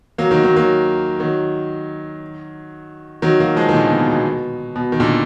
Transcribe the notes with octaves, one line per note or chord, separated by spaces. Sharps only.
F#3 A#3
D#3 F#3
D#3 F#3
F#3 A#3
D#3 F#3
D#3 F#3
F#3 A#3
F3 G#3
D#3
A#2 D3
B2
B2
B2
B2
D#3
A#2 D3